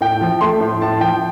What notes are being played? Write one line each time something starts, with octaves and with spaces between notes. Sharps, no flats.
A2 G5
F3
A3 C6
A2
A2 A5
F3 G5